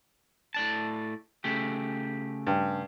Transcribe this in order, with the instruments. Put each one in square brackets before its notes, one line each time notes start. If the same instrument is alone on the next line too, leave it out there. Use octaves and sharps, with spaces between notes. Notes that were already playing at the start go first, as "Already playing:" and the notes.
[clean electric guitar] A2 D5 A5
C#3 A3 G4
[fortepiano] G2